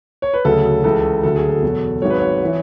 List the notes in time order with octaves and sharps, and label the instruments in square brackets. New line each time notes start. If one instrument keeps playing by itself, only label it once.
[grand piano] C#5
B4
D2 C#3 F#3 A4
C#2 C#3 E3 A4
D2 D3 F#3 A4
G#4
A4
E2 B2 F#3
G#1 G#2 F#3 C#5
B4
C#5
E3